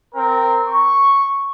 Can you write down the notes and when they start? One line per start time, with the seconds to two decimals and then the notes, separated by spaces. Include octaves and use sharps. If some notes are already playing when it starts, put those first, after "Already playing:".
0.14 C4 A#4
0.67 C#6